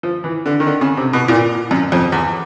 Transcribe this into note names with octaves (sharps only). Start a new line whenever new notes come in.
F3
E3
D3
D#3
D3
C#3
C3
B2
A#2
F#2
F2
E2